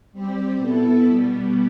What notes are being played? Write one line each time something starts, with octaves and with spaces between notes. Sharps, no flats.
G3 C4 G4
B2 B3 E4 A4
B2 G3 B3